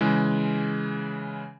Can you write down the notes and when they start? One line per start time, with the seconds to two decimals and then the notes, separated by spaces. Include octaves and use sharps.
0.01 C#3 E3 G#3